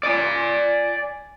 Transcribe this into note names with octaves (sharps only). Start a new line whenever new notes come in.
D5 G#5